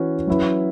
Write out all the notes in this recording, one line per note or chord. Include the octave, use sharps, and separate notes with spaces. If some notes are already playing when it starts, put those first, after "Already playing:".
Already playing: E3 C#4 F#4 B4
F#3 C#4 E4 B4